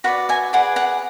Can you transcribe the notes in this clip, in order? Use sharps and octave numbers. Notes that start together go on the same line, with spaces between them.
F#4 B4 D5 F#5
E5 G#5
G#4 B4 D5 F#5
F#5